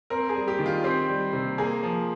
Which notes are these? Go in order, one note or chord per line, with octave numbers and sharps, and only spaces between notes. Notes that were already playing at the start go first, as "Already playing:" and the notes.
C4 A#4
G#4
G3
G4
D#3
F4
C4 G4
G3
C3
A#3 G#4
F3